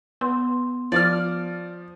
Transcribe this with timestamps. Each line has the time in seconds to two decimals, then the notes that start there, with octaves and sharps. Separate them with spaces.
0.21 B3 C6
0.92 F3 D5 D6 F6